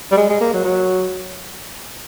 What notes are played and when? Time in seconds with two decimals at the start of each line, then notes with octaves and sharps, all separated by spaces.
0.12 G3
0.18 G#3
0.30 G#3
0.41 A#3
0.53 F#3
0.64 F#3